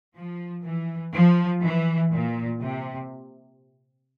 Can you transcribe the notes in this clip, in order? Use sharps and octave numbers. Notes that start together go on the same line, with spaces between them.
F3
E3
F3
E3
A#2
C3